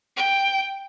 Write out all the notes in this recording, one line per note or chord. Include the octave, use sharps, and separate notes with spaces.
G5